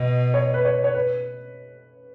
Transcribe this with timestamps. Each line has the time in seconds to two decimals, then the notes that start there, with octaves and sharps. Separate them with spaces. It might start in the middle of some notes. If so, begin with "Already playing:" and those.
Already playing: B2 D#5
0.34 C#5
0.54 B4
0.65 C#5
0.84 C#5
0.94 B4